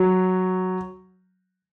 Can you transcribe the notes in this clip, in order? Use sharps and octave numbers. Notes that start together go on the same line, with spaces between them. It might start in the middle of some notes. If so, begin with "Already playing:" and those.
Already playing: F#3